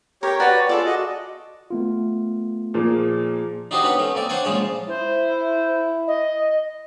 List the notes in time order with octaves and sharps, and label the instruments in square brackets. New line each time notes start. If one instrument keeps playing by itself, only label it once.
[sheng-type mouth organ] G4 C#5 [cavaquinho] A#4 G5
[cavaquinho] F#4 C#5 G5 [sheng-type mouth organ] B4 D5
[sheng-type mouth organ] F4 [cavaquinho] G#4 A4 D5
[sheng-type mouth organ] F#4 D#5
[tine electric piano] A3 B3 F4
[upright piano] A#2 F3 A#3 [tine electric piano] G#4
[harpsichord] D4 D#4 F#4 G4 C5 D#5
B3 C#4 B4 F#5
A3 C#4
A#3 C4 D5
D4 C5 C#5 F#5 G#5
A#1 F3 G#3 C#4 A5
[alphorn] E4 [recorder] C5
[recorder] D#5